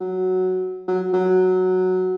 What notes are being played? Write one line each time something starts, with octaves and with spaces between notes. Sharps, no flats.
F#3
F#3
F#3